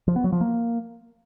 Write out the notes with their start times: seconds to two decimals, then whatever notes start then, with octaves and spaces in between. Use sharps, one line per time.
0.08 F3
0.16 B3
0.24 F#3
0.32 F3
0.41 A#3